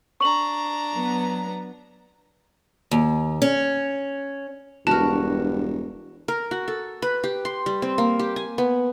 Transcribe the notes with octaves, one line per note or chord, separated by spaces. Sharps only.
D4 A#5 C#6 F#7
F#3 B3
D#2
C#4
E1 G2 F#4 A#4 A5
A#4
F#4
A4
B4
G4
C6
G3
C4
A#3
G4
G#5
B3